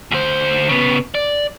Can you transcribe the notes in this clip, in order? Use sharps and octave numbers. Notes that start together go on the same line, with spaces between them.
D2 C5
C#3 B3
D5